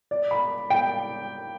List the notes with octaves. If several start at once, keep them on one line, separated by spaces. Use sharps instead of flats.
D5
B5
G5